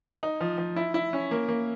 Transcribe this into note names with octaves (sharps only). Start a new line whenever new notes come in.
D#4
F3
F3
E4
E4
C#4
A#3
A#3